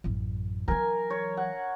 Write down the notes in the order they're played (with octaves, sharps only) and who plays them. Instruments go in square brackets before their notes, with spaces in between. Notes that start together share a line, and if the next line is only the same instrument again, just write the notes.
[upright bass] A1 F#2
[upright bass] E3 F#3 [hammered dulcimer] A#4 G#5
[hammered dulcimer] C#5
F#5